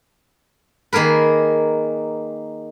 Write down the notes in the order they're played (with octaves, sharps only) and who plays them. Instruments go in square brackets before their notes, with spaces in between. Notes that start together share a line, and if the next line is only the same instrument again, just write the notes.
[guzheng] D#3 A#3 G#4 A#4 B4